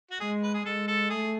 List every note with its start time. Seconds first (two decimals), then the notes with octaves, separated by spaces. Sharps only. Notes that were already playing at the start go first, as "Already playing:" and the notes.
0.11 F#4
0.20 G#3 G#4
0.43 B4
0.54 G#4
0.65 G#3 A4
0.88 A4
1.09 A3 G#4